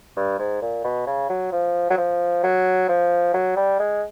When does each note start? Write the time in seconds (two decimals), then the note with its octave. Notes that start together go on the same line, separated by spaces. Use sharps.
0.16 G2
0.39 G#2
0.61 A#2
0.84 B2
1.06 C#3
1.29 F#3
1.52 F3
1.90 F#3
1.97 F3
2.43 F#3
2.89 F3
3.33 F#3
3.56 G3
3.79 G#3